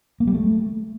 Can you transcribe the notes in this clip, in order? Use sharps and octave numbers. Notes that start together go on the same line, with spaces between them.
A#3
G3
A3